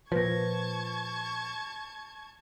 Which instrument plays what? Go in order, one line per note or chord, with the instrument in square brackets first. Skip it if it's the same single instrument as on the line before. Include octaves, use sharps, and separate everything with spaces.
[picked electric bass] A#2 F3 [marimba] B4 A#6 [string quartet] A5 C#6 G#6